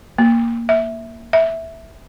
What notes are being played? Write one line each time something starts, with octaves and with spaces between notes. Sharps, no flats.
A#3
E5
E5